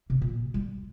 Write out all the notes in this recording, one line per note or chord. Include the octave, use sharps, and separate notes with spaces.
C3
A#2
G3